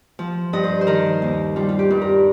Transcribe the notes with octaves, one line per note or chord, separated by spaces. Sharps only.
F3
G2 D#5
C5
C5
D#3 A#4
D#2
G3 F4
F4
G4
G2
A#4